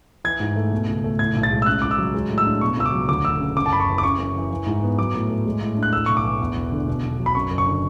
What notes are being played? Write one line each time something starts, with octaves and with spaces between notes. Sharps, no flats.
E3 G#6
G#2
A3
B2
C#2
A3
A2 G#6
B1
A6
G#3
E6
C#3 F#6
C#2 D6
E6
F#3
G#3
A2
E6
D4
B2 C#6
C#2 E6
D6
F#3
D2 D6
E1 E6
C#3
F#2 D6
A5
F#1 B5
C#6
E3
D6
C#3 C#6
F#2
E3
E3
G#2
B3
F#3 D6
A2
A3
G#3
A2
D4
F#6
A2 E6
B1 C#6
D6
E3
E2
E1
D3
B2
B1
F#3
B5
F#2 C#6
F#1
C#6
D3